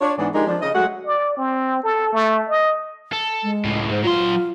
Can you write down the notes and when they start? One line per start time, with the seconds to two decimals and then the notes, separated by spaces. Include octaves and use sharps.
0.01 D4 F4 C#5
0.18 G#2 E3 B3 D4 G#4 D5
0.35 F3 G#3 D4 D#4 G4 A#4
0.47 F3 D4
0.62 C#3 D#5
0.74 F#3 G#3 A3 F#4 F#5
1.06 D5
1.37 C4
1.84 A4
2.13 A3
2.49 D#5
3.13 A4
3.43 G#3
3.65 C#2 A2
3.91 G#2 C5
4.04 F#3 F4 C6